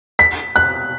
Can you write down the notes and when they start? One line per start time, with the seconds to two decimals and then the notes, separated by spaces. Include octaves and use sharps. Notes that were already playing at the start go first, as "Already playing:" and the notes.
0.19 B6
0.56 F#6